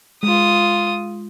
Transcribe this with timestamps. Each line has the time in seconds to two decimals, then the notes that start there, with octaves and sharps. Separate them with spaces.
0.23 G#3 F4 D#6